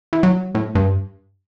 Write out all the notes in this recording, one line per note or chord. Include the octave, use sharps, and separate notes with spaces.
E3
F#3
A2
G2